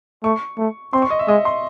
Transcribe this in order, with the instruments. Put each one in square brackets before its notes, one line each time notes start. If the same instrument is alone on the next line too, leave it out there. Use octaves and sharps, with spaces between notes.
[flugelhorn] A3 [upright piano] C#6
[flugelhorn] A3
[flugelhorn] C4 [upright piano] C6
[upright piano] C#6
D#5
E5
[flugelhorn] G#3 [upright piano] D#5
[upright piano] C6